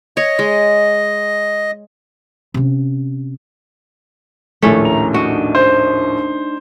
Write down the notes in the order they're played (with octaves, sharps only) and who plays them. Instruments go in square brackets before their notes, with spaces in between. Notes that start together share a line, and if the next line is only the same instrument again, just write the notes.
[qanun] C#5 [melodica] D#5
[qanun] G#3
[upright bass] C3 C#4
[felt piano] A#1 D#2 A2 [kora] A3 C#4
[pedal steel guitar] A#5
[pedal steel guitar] D4 D#4 [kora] F#4
[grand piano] C5